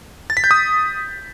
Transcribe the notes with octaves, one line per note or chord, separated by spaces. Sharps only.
A6
B6
G6
D#6